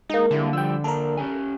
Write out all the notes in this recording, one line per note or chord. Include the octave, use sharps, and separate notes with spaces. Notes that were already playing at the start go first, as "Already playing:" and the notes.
G#3 A#3 D#4
D3 G3 E4 A4
F3 G3 G5 E6
A#3 D4 A4 A#4
C#4 G4 G#5